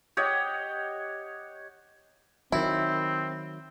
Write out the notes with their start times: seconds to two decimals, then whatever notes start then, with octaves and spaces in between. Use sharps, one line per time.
0.17 G4 C#5 D#5 F#5
2.52 D#3 F#3 C4 E4